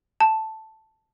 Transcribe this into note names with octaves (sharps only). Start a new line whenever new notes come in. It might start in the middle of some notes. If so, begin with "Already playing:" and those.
A5